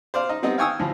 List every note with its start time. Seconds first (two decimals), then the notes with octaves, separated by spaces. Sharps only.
0.14 C5 D5 F5
0.29 D#4
0.43 G3 B3 C4 D#4
0.58 F5 G5 G#5 C#6 D#6 E6
0.80 D2 A2 F3